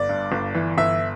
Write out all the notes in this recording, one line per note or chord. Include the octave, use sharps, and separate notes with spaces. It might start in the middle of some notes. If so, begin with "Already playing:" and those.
Already playing: G1 D5
G2
G1
E3
G1 E5